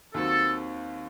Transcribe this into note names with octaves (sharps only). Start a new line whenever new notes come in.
D#2 D#3 F#3 C4 A4